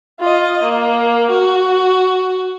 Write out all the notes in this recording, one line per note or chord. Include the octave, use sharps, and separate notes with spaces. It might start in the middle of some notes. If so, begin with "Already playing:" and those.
F4 D#5
A#3
F#4